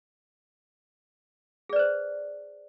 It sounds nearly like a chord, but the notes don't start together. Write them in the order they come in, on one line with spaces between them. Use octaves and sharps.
G#4 D5 B4 C5